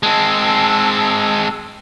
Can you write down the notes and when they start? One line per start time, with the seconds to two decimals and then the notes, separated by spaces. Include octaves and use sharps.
0.03 G#3 C4 A5 E6